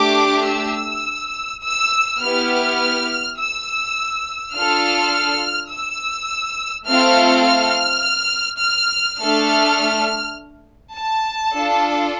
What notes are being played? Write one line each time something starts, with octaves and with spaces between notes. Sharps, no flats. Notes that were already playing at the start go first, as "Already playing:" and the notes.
Already playing: A3 D4 G4 D6
E6
E6
B3 E4 G4 F6
E6
D4 F4 A4 F6
E6
A3 C4 F4 A4 F6
F6
F6
A3 D4 A4 F6
A5
D4 F4 A4